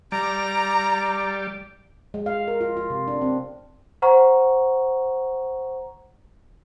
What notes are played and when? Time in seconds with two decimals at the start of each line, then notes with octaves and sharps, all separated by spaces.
0.12 G3 D5 A#5
2.14 G#3
2.26 F5
2.48 A#4
2.61 F4
2.77 F4
2.90 C3
3.08 D4
3.21 C4
4.02 C5 F#5 A#5 C#6